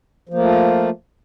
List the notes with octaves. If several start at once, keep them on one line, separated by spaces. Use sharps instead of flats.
F3 A3 A#3 F4